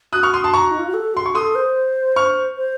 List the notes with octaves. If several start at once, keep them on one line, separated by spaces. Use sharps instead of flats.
F#4 D#6 F#6
C#6 F6
C6 D#6
A5 C6
A#5 C#6
D#4
F4
F#4
A4
F#4 C6
C#6
A4 C6 D#6
C5
C#6 F6
C5